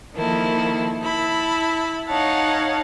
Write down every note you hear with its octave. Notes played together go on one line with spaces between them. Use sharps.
D#3 F3 A#3 E4 A4
E4 A5 B5
D#4 C#5 F5 F#5 A5